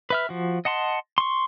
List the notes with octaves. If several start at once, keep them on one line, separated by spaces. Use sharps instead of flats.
B4 E5 F6
F3 F#4
D#5 F#5 A5 C6
C6 C#6